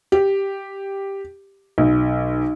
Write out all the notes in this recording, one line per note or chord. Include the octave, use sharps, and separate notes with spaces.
G4
B1